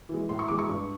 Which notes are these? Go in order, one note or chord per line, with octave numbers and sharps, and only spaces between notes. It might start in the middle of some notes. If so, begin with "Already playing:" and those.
E3 G#3
A2 C6
C#6
E3 G#3 D6
C#6
G2